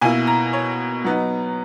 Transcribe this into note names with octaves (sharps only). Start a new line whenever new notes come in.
B2 A#3 E4 G#5
A#5
C#5
F#3 B3 D#4